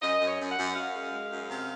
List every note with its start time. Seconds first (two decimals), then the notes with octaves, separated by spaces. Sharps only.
0.02 F#2 D#5
0.20 F#2
0.27 C#5
0.40 F#2
0.51 F#5
0.58 F#2
0.76 F#2 F5
0.94 G#3
1.12 G#3
1.31 F#2
1.50 C3